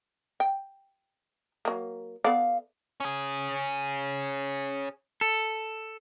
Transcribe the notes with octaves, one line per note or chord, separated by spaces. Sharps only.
G5
F#3 A#3
B3 A4 D5 F5
C#4 G#4
A4